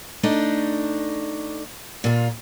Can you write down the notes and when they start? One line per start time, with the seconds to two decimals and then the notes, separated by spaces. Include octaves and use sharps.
0.23 A3 D4 D#4
2.04 A#2 F4